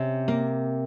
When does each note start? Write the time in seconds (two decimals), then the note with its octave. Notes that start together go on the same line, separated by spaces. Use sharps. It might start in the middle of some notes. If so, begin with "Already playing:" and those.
Already playing: C3 C#4
0.28 A#3